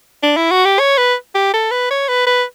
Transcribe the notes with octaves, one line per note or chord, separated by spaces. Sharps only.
D4
E4
F#4
G4
C#5
B4
G4
A4
B4
C#5
B4
B4